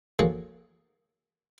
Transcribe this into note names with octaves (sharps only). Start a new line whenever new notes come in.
F3 A#3 F#4 G#4 A4 C#5